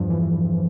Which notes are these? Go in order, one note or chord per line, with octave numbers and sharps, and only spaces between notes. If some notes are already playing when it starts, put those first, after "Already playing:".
Already playing: E2 G2 F3
E3